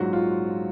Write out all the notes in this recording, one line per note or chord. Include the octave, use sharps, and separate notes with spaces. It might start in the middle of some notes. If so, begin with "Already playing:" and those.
Already playing: A#1 G#2 F#3 F#4
F4